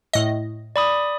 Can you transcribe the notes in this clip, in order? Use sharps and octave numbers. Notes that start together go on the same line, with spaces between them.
A2 D#5
D5 B5 D#6